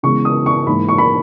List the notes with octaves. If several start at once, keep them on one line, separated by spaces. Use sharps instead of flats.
C#3 E3 G#3 B3 C#6
D#6
C#6
G#2 E3 A#3 B5
C#6
B5